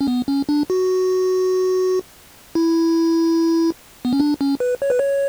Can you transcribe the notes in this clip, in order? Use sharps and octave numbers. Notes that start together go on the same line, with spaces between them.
C#4
B3
C#4
D4
F#4
E4
B3
C#4
D4
C#4
B4
C#5
B4
C#5